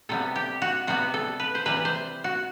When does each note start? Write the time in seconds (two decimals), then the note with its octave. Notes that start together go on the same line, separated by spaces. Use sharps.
0.09 C3 G3 B3 A4
0.36 G4
0.62 F#4
0.87 C3 G3 B3 F#4
1.14 A4
1.40 B4
1.55 C5
1.65 C3 E3 G3 B4
1.85 C5
2.24 F#4